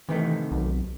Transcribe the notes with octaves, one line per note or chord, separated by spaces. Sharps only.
C3 D#3 E3 A3
B1